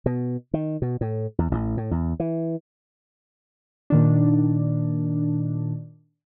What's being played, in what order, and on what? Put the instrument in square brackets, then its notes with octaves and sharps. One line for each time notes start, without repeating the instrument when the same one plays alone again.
[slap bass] B2
D#3
B2
A2
E2
A1
A2
E2
E3
[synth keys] A#2 D#3 D4